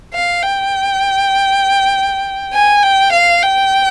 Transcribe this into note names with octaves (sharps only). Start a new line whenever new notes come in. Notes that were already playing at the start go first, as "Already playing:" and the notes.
F5
G5
G#5
G5
F5
G5